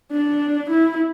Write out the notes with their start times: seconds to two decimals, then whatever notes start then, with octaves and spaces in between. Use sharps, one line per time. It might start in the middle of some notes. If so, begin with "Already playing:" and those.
0.12 D4
0.70 E4